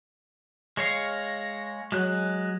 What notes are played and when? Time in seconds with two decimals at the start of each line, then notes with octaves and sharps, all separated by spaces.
0.77 G#3 C#5 F5 A#6
1.92 F#3 G#3 F#6